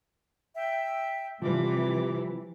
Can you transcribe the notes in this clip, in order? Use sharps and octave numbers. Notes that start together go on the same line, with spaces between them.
E5 G5
C3 E3 F3 G3 D6